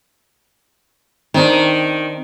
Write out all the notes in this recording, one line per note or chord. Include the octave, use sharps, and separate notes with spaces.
D#3 C4 D4